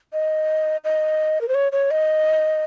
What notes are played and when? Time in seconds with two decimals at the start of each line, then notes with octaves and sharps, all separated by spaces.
0.13 D#5
0.84 D#5
1.41 A#4
1.48 C5
1.54 C#5
1.72 C#5
1.91 D#5